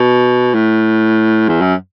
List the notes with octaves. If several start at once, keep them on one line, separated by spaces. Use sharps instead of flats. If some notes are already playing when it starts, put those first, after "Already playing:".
Already playing: B2
A2
E2
F#2